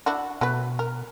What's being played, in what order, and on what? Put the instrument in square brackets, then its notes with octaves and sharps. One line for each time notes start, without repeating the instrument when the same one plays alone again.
[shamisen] D4 E4 F#4
[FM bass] B2 [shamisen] F#3 A3 B4
[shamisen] A#4